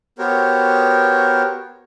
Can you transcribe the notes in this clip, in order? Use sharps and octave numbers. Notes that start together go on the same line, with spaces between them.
B3 F#4 G4 A#4 C5 C#5